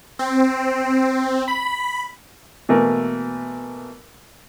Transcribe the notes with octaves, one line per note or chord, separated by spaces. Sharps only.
C4
B5
B2 E3 A3 A#3 A#4